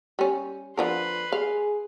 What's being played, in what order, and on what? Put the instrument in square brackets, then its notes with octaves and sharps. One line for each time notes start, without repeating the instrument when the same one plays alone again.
[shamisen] G3 C#4
[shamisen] D3 F3 A#4 [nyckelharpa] B4 C6
[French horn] G#4 [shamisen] F5